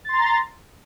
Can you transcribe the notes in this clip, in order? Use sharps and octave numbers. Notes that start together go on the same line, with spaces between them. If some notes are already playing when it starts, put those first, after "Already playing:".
A#5 C6 A6